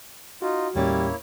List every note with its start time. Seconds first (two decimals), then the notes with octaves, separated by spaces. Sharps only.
0.42 D#4 F4 F#4
0.75 D#2 A2 G3 A#3 C#4 E4 C#5